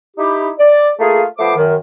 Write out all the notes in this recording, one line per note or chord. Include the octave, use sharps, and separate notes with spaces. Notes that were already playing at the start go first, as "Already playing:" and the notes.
D#4 E4 G4
D5
A3 A#3 F4 G#4
F3 A3 B3 C5 D6
F#2 D#3